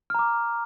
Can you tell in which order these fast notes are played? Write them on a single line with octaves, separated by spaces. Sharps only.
F6 A#5 D6